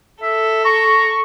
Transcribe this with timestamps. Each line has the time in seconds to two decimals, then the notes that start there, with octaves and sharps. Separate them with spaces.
0.23 A4 E5
0.65 A#5 C#6